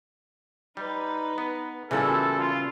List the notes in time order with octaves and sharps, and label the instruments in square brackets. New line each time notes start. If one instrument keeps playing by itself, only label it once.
[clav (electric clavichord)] G3 [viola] D#4 B4
[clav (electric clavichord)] B3
[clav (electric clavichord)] A#2 E3 [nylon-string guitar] C#3 G3 B3 [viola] E4 F#4 [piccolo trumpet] A4
[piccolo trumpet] F4